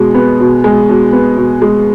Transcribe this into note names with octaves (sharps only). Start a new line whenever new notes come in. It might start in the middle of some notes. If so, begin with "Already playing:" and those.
Already playing: B2 G#3
B3
B2
G#3
B2
B3
B2
G#3